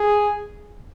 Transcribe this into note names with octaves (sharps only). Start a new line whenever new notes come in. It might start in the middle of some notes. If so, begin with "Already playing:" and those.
Already playing: G#4